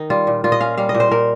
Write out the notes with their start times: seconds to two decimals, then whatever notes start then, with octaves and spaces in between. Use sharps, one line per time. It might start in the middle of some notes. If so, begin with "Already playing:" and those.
Already playing: D#3 D#4
0.10 G3 F4
0.27 A#2
0.44 A#2 F4
0.52 D#5
0.61 C#4 F5
0.78 G3 F5
0.89 D#5
0.95 A#2
1.00 C5
1.11 A#2 A#4